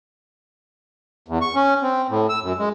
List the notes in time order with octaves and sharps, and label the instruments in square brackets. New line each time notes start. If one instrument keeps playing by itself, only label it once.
[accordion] E2
C#6
C#4
C4
A2
E6
F#2
G#3